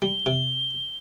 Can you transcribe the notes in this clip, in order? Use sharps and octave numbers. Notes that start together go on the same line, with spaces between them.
G3 G7
C3